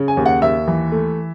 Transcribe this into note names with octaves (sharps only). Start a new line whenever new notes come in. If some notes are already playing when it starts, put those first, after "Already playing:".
Already playing: C#3
G#5
D#2
F#5
D#2 E5
E3
A3